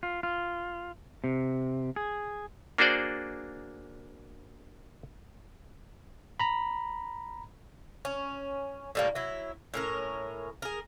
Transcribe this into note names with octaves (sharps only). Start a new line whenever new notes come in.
F4
F4
C3
G#4
A#3 D4 F#4 G#4 C5 D5
A#5 B5
C#4
A2 G3 A#3
F#3 E4
A2 C#4 A#4
G#4 A#4